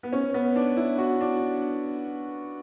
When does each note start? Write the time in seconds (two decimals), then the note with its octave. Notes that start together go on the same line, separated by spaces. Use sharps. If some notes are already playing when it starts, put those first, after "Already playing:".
0.03 B3
0.13 C#4
0.34 B3
0.56 D4
0.77 E4
0.98 F#4
1.21 D4